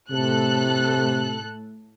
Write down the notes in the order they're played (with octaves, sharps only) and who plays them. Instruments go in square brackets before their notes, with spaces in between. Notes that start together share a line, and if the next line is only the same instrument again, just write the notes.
[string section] A2 A4 F#6 [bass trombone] C3